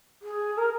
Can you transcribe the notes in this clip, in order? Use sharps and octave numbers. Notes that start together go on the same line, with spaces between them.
G#4
A#4